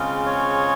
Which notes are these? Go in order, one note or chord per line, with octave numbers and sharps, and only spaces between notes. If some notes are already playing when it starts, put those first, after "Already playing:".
Already playing: C#3 G#3 C4 F4
C#5